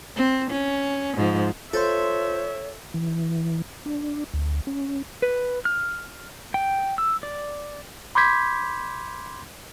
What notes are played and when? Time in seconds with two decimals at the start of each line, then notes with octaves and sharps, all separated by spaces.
0.16 C4
0.51 C#4
1.16 G#2 F3
1.73 F4 A4 C5 C#5 E5 C6
2.94 E3
3.86 D4
4.34 D2
4.67 C#4
5.22 B4
5.65 F6
6.54 G5
6.98 E6
7.23 D5
8.15 B5 C6 D6 G6 G#6 B6